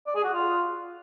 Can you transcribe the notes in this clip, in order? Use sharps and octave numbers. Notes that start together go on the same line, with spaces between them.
D5
G#4
F#4
F4